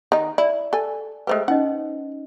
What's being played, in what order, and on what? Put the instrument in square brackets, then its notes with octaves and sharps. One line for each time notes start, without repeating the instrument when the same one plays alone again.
[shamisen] D#3 D#4
[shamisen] E4 [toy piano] D5
[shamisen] A4 G#5
[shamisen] G#3 A3 G4 [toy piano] B4 C5
[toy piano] C#4 D#4 D#5 [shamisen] F#5